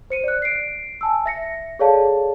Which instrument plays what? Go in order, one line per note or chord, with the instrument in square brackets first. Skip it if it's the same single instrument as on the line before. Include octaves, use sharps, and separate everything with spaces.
[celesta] C5 C#7 D#7
D5 F#6
C7 D7
G#5 A5 E6
E5 A#6 C#7
G#4 A4 C#5 D5 F5 A5